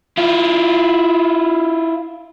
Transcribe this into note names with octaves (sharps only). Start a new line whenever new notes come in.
E4 F4